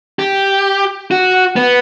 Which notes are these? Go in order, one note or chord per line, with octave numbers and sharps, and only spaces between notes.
G4
F#4
B3